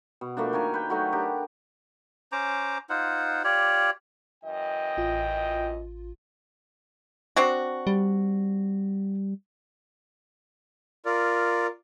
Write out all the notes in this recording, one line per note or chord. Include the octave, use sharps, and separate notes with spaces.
B2
F3 A3 A#3 D4
D#3 A#4 C#5 G#5
B4 G5
F#3 A3 D#4 F#4
D4 G4 A#4
C#4 C5 A#5 D6
D#4 F4 C5 F#5
F4 G4 C#5 D5
F#2 E3 D#5 G5
A1 F4
C4 D4 F#4
G3
F4 A#4 D5